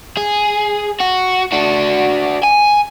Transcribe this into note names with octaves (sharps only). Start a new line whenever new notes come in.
G#4
F#4
D4 F#4
G#5